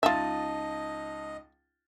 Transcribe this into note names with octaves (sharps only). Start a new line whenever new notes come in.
C#2 D#4 F4 D#5 E5 A5 A6